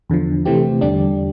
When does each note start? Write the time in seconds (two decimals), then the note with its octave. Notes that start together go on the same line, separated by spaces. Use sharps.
0.10 E2 D3 F3
0.45 C3 E3 A3 C4 G4
0.81 E2 D3 G3 D4 G4